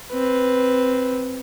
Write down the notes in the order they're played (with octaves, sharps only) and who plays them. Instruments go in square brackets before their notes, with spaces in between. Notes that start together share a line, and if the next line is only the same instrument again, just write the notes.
[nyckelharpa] C4 B4